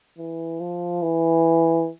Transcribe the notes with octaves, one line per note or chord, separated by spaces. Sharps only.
E3
F3
E3